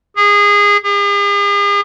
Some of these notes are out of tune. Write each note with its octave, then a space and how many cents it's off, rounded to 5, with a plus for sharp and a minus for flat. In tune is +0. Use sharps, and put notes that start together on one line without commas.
G#4 -25
G#4 -45